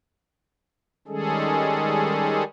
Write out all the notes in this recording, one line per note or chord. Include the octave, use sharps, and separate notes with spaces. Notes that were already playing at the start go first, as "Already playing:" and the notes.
D#3 G3 G#3 C#4 G#4 A4